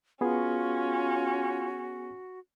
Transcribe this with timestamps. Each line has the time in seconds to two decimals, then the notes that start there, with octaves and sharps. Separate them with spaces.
0.21 B3 C#4 F4 F#4 G#4